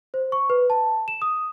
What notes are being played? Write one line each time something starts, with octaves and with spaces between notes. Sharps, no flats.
C5
C#6
B4
A5
E7
D#6